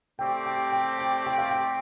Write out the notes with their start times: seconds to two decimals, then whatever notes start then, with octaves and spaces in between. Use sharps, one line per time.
0.19 A3 C4 G4 D5 G5
0.46 G5
0.72 G5
0.99 G5
1.26 G5
1.38 F5
1.51 G5